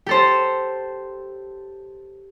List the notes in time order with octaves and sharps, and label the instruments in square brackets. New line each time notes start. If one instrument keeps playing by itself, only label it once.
[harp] G4 A4 C5